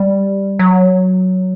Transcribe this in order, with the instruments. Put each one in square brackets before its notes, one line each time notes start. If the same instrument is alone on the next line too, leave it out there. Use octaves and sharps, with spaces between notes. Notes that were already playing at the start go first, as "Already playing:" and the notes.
Already playing: [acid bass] G3
F#3